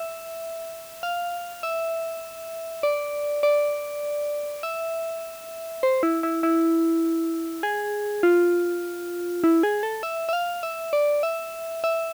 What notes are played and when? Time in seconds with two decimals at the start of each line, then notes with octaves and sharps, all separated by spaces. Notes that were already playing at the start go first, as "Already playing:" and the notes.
Already playing: E5
1.03 F5
1.63 E5
2.83 D5
3.43 D5
4.63 E5
5.83 C5
6.03 E4
6.23 E4
6.43 E4
7.63 G#4
8.23 F4
9.44 E4
9.63 G#4
9.83 A4
10.03 E5
10.29 E5
10.33 F5
10.63 E5
10.93 D5
11.23 E5
11.84 E5